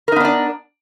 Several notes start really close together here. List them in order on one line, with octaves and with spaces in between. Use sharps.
A#4 D#4 B3 D4 D5